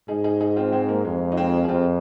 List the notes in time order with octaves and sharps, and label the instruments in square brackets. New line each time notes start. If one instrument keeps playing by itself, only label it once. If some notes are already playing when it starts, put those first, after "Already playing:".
[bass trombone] G#2 [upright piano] D#4 G#4
[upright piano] D#4 G#4
D#4 G#4
C4 F4
G#3 C4
A#3
[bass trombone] F2 [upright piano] G#3
[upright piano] D#4
G#3 C4
G#4
[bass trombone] F2 [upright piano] C4 F4